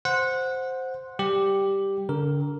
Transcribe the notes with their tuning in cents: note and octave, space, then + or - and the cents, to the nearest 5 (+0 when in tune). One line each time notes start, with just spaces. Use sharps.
C5 +0 F#5 -15
G3 +0 G4 +0
D3 -30 A#4 +0